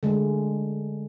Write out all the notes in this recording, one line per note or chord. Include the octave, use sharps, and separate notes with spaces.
D3 G#3 A3